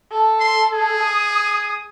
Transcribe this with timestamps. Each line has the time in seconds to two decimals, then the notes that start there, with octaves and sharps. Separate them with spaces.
0.11 A4
0.40 C6
0.73 G#4
1.03 D#6